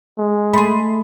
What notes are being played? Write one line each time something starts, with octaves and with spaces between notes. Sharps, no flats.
G#3
A3 G#4 B5 C6